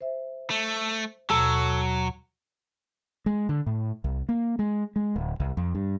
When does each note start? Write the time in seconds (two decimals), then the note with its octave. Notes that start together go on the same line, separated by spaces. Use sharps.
0.01 C5 E5
0.50 A3
1.30 D#2 B2 F#3 A4 E6
3.26 G#3
3.49 D3
3.66 A2
4.04 C2
4.29 A#3
4.59 G#3
4.96 G#3
5.16 D1
5.40 C2
5.57 F2
5.75 G2